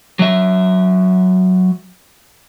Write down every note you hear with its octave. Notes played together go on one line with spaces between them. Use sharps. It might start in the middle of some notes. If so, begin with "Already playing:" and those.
F#3 E5